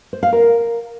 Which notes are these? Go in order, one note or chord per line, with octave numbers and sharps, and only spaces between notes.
C5
F5
A#4